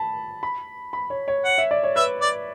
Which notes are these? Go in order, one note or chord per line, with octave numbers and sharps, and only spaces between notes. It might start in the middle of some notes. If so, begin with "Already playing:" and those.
Already playing: A5 B5
B5
B5
C#5
C#5
F#5
E5
D5
C#5
B4 E5
D5